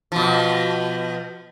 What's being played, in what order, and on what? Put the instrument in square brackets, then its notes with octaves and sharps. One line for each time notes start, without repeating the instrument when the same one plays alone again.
[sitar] B2 F3